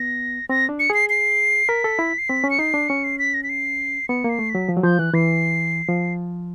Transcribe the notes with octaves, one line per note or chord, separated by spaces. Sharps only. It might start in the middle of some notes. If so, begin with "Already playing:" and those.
Already playing: B3 A#6
C4 A#6
D4
C#7
G#4 C7
C7
A#4 B6
A4
E4
C7
C4 B6
C#4
C#7
D#4 C7
D4
C#4 C#7
C7
B6
A#6
B6
C7
B3 C#7
A#3 C7
A3
F#3 B6
F3
F#3
F3 G6
E3 F#6
E3 C7
F3